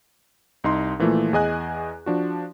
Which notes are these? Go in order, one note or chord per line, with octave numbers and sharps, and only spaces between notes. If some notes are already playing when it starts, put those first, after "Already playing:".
C2 D#4 C6
A#2 E3 F3 A3 A#3
E2 G#4 D#5 G#5 F#6
F3 D4 F#4